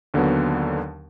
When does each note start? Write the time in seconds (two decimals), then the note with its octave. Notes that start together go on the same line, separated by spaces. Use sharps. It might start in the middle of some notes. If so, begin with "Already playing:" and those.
0.14 D#2 D3 F#3 B3